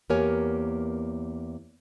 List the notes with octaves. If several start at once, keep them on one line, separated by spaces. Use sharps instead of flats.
E2 A#3 G4 A#4 C#5 G#5